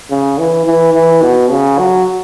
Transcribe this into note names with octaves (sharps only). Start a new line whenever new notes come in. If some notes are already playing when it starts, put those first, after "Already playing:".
C#3
E3
E3
E3
B2
C#3
F#3